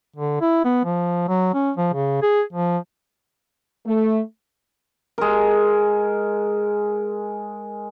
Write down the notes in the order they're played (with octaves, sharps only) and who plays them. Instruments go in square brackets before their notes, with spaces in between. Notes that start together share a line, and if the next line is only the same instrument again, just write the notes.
[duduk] D3
E4
B3
F3
F#3
C#4
F3
C#3
G#4
F3
[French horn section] A3
[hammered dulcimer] G#3 A#4